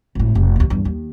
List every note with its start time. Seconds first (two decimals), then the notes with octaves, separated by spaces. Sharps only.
0.15 G#1 A2
0.35 F1
0.56 D#2 B2
0.70 E2 G2
0.85 D#2